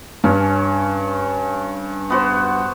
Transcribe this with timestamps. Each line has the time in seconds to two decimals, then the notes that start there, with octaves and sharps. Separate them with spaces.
0.24 G2 C#4
2.10 B3 F#4 C5